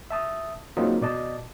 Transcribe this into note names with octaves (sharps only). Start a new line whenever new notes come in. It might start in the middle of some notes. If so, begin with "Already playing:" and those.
E5 A5 D#6
F#3 G#3 A#3 C4 D#4 F4
B2 D5 D#5 A5